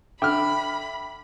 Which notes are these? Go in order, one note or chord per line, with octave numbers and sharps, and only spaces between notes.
D3 E5 G5 B5 D6 F6